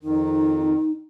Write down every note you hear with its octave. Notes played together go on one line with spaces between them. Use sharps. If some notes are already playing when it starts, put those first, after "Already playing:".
F2 D#3 D#4